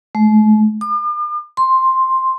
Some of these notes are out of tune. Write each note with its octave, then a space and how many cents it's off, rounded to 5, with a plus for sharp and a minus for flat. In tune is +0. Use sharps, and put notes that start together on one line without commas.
A3 -45
D6 +45
C6 +5